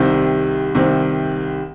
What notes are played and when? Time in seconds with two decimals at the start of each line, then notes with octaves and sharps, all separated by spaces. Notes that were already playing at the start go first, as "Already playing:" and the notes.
Already playing: C2 C3 D#3 C4
0.75 C2 C3 D#3 C4